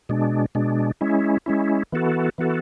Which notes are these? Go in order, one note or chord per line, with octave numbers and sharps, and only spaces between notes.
B2 G#3 D4
B2 G#3 D4
G#3 C#4 E4
G#3 C#4 E4
E3 B3 F#4 A4
E3 B3 F#4 A4